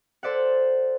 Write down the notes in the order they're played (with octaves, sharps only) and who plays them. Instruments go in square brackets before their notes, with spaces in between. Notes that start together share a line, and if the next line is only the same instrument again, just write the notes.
[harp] A4 C5 D5 E5 F#5